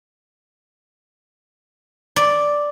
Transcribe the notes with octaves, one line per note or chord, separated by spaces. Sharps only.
D5